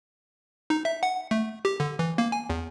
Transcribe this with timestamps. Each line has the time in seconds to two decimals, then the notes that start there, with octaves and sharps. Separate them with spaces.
0.70 D#4
0.85 E5
1.03 F#5
1.31 A3
1.65 G4
1.80 D3
1.99 E3
2.18 A#3
2.32 G#5
2.50 E2